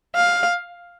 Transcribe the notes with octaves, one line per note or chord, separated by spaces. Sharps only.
F5